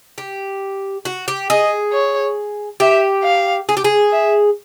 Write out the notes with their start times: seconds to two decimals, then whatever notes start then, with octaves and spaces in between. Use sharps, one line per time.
0.18 G4
1.05 F#4
1.28 G4
1.50 G#4 D#5
1.92 C#5
2.80 G4 E5
3.24 F5
3.69 G#4
3.77 G4
3.84 G#4
4.12 E5